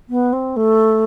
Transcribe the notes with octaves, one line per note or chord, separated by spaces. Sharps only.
B3
C4
A3